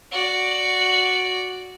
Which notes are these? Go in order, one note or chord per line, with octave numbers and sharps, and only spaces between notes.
F#4 D5